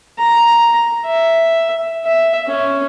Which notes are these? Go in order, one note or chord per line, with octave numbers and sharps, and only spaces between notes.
A#5
E5
E5
C#4